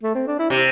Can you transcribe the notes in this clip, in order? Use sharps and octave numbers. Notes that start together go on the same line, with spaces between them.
A3
C4
D4
E4
C3 G4